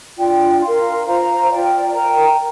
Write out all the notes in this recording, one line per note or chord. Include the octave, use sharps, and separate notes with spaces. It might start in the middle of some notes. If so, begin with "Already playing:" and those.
D4 F4 D5 G5
A#4 F5 C6
F4 C5 F5 A#5
F4 D5 G5
A#4 G5 A#5